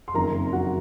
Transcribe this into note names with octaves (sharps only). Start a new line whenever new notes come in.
C6
F#1 F2 D#3 A#4 A#5
F#4 F#5